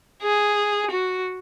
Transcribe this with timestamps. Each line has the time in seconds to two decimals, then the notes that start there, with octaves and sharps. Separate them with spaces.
0.22 G#4
0.91 F#4